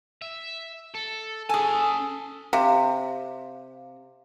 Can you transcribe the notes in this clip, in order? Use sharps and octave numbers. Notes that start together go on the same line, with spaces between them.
E5
A4
C#4 G#4 A4 G#5 A5
C3 F5